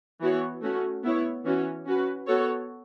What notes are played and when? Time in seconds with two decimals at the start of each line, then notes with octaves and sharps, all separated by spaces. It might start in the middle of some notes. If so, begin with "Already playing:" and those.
0.20 E3 B3 F#4 C#5
0.62 A3 C#4 F#4
1.03 B3 E4 C#5
1.45 E3 C#4 F#4
1.86 C#4 F#4 B4
2.27 B3 F#4 A4 C#5